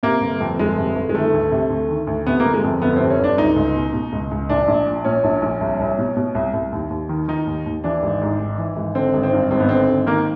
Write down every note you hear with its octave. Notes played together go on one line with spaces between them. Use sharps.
C3 A#3
G1
F2
G1 G#3
C3
G1
G#3
D#3 A3
D2
C3
D2
D#3
D2
C3 B3
G1 A#3
G#3
F2
G1 B3
C3 C4
C#4
G1 D4
C#2 D#4
C#2
B2
B2
C#2
C#2
A#1 D4
A#1
A#2
A#2 C#4
A#1
A#1
C2
C2
B2
B2
C2
C2
D#2
D#2
D#3
D#3 D#4
D#2
D#2
E3 D4
G#1
G#2
G#1
E3
G#1
D3 C4
G#1
C4
G2
G#1 C4
B3
D3 C4
G#1
D#3 A#3